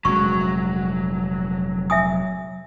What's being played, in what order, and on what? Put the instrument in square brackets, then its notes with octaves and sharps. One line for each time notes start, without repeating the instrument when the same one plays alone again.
[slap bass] F1 A#2 G#3 [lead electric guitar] F#3 [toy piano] C#6
[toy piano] E5 G#5 D#6